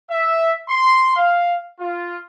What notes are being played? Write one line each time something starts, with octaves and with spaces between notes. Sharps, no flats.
E5
C6
F5
F4